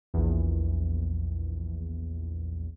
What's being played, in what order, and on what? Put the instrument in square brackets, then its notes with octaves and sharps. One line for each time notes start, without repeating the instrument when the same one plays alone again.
[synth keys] A#1 E2